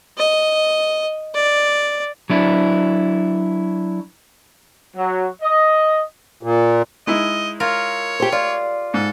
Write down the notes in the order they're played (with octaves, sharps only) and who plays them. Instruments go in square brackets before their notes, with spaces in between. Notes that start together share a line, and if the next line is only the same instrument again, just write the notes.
[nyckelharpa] D#5
D5
[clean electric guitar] F#3 D4 E4
[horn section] F#3
D#5
[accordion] A#2
[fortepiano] G#3 D#4 E4 [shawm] D#5
[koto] F4 A#4 [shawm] C#5
[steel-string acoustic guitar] G4 C5
[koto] F4 [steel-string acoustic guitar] D5
[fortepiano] G#2 [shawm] A4